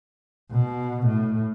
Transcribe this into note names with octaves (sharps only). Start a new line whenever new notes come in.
B2
A2